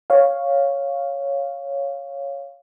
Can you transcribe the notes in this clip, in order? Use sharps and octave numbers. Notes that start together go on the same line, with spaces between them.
C#5 F5